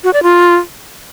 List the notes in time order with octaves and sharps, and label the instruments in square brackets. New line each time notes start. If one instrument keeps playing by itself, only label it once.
[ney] F#4
D5
F4